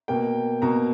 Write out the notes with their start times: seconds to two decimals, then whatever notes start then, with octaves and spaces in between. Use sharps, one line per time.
0.08 B2 A#3 G5
0.62 B2 A#3 A#5